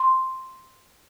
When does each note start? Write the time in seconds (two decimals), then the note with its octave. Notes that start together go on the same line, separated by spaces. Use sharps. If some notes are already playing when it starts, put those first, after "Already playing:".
Already playing: C6